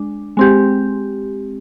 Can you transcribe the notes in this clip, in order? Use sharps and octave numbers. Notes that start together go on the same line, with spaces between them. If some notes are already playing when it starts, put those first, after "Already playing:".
Already playing: G#3 D4
G#3 C4 G4